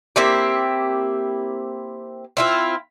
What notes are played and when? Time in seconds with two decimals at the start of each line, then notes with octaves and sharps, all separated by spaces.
0.16 A#3 C4 E4 G4
2.37 C4 E4 F4